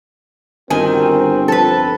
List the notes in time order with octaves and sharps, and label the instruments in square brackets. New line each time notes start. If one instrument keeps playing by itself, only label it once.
[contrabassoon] G1 [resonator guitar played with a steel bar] D#3 G#5 [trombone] C4 [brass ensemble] F#4 A#4
[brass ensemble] F3 [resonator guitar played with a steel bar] A4 B4